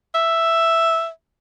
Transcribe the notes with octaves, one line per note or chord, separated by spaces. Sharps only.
E5